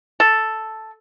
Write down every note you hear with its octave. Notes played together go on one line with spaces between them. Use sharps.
A4